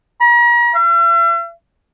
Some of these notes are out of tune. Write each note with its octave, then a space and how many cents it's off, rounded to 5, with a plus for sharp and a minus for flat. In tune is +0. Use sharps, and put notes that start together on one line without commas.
A#5 +40
E5 +45